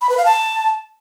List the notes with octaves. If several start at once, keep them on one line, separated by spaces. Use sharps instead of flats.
B5
B4
F5
A5